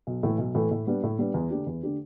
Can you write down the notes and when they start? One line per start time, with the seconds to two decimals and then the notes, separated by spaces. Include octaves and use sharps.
0.07 B1
0.23 A2 E3 A3
0.38 B1
0.55 A2 E3 A3
0.71 A2
0.87 G3 B3 D4
1.03 A2
1.19 G3 B3 D4
1.34 E2
1.50 D3 A3 D4 G4
1.67 E2
1.83 D3 A3 D4 G4